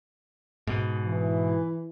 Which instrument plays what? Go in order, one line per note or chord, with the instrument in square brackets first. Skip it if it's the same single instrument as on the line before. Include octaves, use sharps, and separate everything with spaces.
[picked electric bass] G#2 B2
[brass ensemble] E3